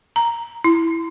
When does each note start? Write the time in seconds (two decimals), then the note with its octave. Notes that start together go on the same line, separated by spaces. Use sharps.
0.16 A#5
0.64 E4